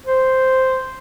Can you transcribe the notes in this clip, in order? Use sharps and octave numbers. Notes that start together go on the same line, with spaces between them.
C5